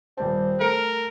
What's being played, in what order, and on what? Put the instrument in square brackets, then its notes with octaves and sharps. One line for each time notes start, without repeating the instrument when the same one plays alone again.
[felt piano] D#1 G3 A5 [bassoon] C4
[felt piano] A3 C#7 [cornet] A#4